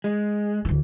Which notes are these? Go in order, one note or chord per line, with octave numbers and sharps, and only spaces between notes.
G#3
D2 E3